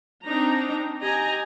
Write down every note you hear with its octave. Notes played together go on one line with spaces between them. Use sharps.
C4 D4 D#4 A#5
G4 D#5 G#5 A#5